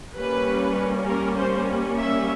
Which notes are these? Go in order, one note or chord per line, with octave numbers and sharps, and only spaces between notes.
G3 A#3 C#4 B4
A#4
C5
E5